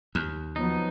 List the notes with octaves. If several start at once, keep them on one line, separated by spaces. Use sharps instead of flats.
D#2
F3 F#3 B3 D#4